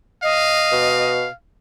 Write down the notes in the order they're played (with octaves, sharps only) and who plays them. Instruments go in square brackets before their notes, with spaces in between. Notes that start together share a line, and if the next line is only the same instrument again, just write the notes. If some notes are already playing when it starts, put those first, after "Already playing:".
[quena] D#5 [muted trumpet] F5
[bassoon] B2